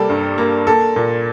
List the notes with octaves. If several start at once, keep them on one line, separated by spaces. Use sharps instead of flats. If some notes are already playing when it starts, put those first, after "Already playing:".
Already playing: C3 G3 A#3 A4
G2
A#3
A#3 A4
A#2